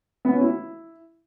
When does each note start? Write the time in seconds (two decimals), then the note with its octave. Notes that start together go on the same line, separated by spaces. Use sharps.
0.25 B3
0.33 C#4
0.40 E4